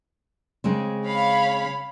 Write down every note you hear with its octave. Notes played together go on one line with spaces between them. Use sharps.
C#3 G#3 C4
C#5 F5 B5